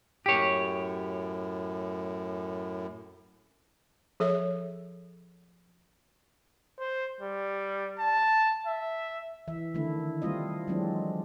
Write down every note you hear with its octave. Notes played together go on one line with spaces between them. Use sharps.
F#2 A2 G4 C#5
F3 G#4 A4 C#5 E5
C5
G3
A5
E5
E3 E5
D3 D#3 A3 E4
G3 A3 C4 F4 D#5
E3 F#3 G#3 C4 D4